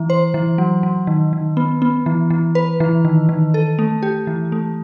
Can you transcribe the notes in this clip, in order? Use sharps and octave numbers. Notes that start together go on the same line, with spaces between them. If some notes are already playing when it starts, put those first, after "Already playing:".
Already playing: E3
C5
E3
F#3
F#3
D#3
D#3
B3
B3
E3
E3
B4
E3
D#3
D#3
A4
A3
G4
E3
A3